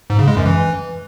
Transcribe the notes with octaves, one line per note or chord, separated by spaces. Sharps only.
G#2
C#3
G#3
F#2
E3